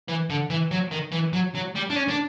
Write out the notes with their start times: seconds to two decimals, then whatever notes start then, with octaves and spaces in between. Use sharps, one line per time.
0.09 E3
0.30 D3
0.50 E3
0.71 F#3
0.92 D#3
1.12 E3
1.33 F#3
1.55 F#3
1.75 G3
1.90 D4
1.96 C#4
2.08 D4